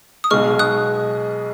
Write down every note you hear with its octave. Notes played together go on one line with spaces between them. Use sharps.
D#6
B1 B2 G#3 C#6 F6
D#6 F#6